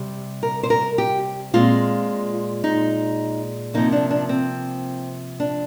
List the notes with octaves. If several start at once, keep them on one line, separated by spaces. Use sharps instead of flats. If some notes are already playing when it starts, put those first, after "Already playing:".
Already playing: C3 G3
A#4
C5
A#4
G4
A#2 G#3 C4 F4
D#4
C3 F3 A#3 D#4
D4
D4
C4
D4